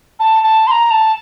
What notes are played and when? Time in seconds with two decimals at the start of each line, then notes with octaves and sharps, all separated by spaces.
0.20 A5
0.43 A5
0.67 C6
0.71 A#5
0.91 A5